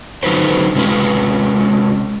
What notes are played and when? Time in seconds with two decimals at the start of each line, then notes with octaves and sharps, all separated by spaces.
0.23 D3 F#3 D#4 B4 C5
0.75 C3 G#3 C#4 B4